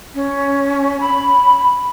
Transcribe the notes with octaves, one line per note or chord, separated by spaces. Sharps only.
C#4
B5